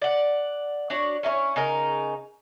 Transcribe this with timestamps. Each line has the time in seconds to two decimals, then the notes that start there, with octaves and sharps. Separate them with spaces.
0.02 D5 F#5
0.90 D4 F#4 C#5
1.23 C#4 E4 A4 C#5
1.56 C#3 D#4 A#4